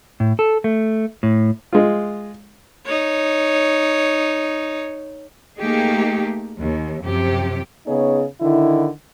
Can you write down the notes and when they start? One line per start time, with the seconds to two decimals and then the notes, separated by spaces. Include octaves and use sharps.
0.20 A2
0.39 A4
0.64 A3
1.23 A2
1.73 G#3 F4
2.85 D#4 C#5
5.58 A3 A#3 D#4 G4 G#4
6.59 D#2
7.03 F#2 C3 F3 G4
7.86 C#3 B3 D#4 G#4 C#5
8.41 D3 D#3 E4